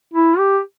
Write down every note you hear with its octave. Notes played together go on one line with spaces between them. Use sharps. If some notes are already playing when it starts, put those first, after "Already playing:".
E4
G4